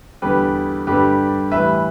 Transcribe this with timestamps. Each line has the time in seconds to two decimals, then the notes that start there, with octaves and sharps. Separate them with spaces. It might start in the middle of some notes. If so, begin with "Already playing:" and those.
0.22 E2 D3 G3 G4 B4
0.87 G2 D3 G3 G4 B4
1.51 A2 E3 G3 B4 E5